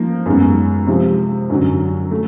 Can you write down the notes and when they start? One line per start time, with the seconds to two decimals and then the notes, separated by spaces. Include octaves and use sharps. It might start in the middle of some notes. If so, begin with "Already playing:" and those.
Already playing: F3 A#3 D#4
0.26 F#2 D#3 G#3 B3
0.87 C3 F3 G#3
1.50 F#2 D3 F#3
2.11 A3